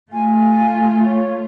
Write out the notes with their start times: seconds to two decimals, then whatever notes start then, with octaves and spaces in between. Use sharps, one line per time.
0.12 A3 F4 G#5
1.04 C#5